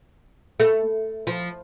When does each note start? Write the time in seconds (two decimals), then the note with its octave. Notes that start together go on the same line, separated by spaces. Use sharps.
0.60 A3
1.27 F3